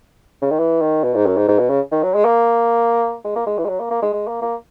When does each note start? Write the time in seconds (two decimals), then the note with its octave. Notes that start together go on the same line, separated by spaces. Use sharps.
0.42 C#3
0.51 D#3
0.60 E3
0.82 D#3
1.04 B2
1.15 G#2
1.26 F#2
1.37 G#2
1.48 G#2
1.59 B2
1.70 C#3
1.92 D#3
2.03 F#3
2.15 G#3
2.25 A#3
3.25 G#3
3.36 A#3
3.47 G#3
3.58 E3
3.65 G#3
3.69 F#3
3.80 A#3
3.91 A#3
4.02 G#3
4.14 G#3
4.28 A#3
4.42 A#3